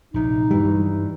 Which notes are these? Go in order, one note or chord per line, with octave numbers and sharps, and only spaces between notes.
A#1 C3 D#4
G2 E3 G3